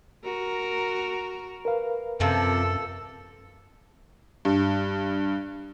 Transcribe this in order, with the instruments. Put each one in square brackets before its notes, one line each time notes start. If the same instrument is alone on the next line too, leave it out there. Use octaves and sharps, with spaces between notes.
[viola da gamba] F#4 A#4
[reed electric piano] A#4 B4 F5
[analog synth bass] F#2 [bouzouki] C3 F3 C4 [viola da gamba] A4
[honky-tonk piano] G2